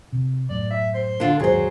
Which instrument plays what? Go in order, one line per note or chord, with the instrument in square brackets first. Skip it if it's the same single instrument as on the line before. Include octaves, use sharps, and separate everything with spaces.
[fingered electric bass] C3
[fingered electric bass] F#2 A2 [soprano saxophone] D5
[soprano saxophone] E5
C5
[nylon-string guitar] D3 F4
[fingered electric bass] F#1 D#2 G#2 [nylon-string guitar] F#3 C5 [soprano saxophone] G#4